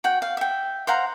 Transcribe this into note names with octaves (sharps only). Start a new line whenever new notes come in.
F#4 F#5 G5
F5
E5 G5
C5 F5 F#5 A#5